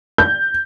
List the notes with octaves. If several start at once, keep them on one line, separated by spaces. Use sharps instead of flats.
G6